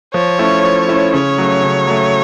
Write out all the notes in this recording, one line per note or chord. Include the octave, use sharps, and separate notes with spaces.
F3 C#5
A3 C#4 E4
F3
A3 C#4 E4
C#3 C#5
F#3 A3
C#3
F#3 A3